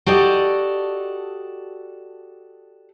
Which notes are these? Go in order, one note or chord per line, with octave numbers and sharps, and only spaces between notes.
F#4 G4 A4 D5 D#5